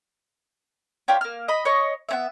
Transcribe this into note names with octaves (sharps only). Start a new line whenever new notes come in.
D4 F4 G4 C#5
A#3 F6
D#5 B5
C#5 D#5 C#6
B3 C#4 E5